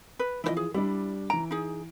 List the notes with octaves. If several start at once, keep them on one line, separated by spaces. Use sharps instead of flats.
B4
E3 F3 E4 C5 D#5
G#4
G3 D4 E4
E3 A#5 D7
D#4 G#4